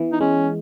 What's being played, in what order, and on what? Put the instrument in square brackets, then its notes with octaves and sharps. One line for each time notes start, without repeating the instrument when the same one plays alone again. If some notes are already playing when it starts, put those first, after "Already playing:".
Already playing: [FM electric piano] E3 B3
[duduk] D#4
[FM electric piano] G#3 [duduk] C#4